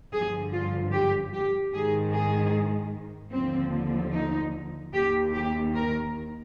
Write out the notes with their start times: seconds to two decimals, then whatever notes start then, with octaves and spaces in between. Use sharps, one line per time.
0.12 G2 D3 F3 G#4
0.53 F4
0.94 G4
1.33 G4
1.73 G#2 D#3 G#4
2.14 G#4
3.33 D#2 D3 F3 C4
4.13 D#4
4.94 D#2 D#3 G4
5.34 G4
5.75 A#4